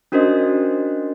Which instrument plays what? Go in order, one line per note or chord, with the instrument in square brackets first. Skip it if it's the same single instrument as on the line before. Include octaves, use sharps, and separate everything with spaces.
[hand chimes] C#4 D4 F#4 A#4 C5 D#5